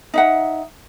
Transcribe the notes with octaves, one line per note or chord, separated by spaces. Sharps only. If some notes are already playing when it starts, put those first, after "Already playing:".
D#4 E5 F#5